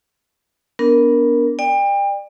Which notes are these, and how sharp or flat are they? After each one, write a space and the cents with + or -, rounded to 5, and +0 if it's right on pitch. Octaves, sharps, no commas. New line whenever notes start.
B3 -10 D4 -20 A#4 +5
D5 +30 G5 +35